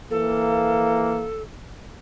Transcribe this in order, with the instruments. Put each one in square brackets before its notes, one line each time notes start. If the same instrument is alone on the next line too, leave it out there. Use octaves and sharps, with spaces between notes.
[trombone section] E3 A#3 [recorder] A4